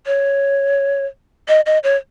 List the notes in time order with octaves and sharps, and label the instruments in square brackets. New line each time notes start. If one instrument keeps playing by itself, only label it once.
[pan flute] C#5
D#5
D#5
C#5